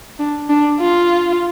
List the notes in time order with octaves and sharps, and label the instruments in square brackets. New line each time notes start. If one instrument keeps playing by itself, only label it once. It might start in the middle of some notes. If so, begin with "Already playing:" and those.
[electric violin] D4
D4
F4